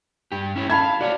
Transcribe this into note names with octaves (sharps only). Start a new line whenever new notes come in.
G2 G4
C#4 E4 C#5
E5 F5 A5 B5 G#6
F#4 C#5 D5 F5